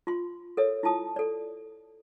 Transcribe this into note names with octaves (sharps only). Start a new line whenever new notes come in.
F4 C6
A4 A#4 C#5 E5
E4 F4 A5 D#6
A4 D5